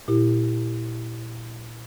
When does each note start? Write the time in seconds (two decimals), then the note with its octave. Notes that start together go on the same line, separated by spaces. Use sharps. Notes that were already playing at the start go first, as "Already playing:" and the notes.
0.08 A#2 E4 G4